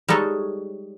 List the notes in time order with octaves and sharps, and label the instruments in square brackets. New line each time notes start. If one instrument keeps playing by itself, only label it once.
[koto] G3 G#3 D#4 A4 C#5